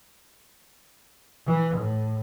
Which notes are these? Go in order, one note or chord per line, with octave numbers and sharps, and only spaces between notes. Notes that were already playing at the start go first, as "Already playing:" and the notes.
E3
A2